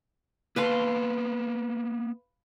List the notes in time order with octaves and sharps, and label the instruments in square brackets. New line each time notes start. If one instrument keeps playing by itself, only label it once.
[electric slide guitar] A#3 B3 A5 [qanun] B4 F5 C6